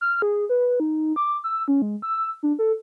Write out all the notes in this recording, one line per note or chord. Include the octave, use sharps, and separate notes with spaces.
F6
G#4
B4
D#4
D6
E6
C#4
G#3
E6
D4
A4